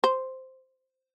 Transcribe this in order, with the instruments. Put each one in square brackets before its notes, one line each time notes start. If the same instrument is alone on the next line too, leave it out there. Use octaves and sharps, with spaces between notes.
[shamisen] C5